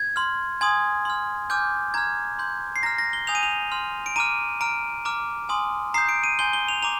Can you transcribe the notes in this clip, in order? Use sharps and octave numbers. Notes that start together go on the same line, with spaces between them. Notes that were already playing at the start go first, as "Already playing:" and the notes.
Already playing: G#6
C6 F6
G#5 C6 D#6 G#6
C6 F6
G#5 D6 F6 G6
A#5 F6 G#6
C6 G6
C7
A#5 F6 A#6
A#6
G7
G#5 D#6 G6 F7
D#7
F7
C6 F6
D7
A#5 D6 F6 D#7
A#5 F6 D7
A#5 D6 F6
G#5 C6 D#6
A#5 D#6 G6 C7
D7
D#7
G#5 C6 G6 G7
G7
F7
A#5 D6 F7